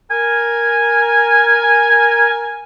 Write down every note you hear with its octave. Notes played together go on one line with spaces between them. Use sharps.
A#4 G#5